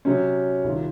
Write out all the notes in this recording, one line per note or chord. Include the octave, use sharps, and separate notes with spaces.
C3 F#3 C#4
C2 C3 D#3 A#3 F4